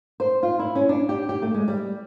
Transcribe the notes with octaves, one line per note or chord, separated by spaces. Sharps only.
C5
F4
E4
C#4
D4
G4
G4
A3
G#3
G3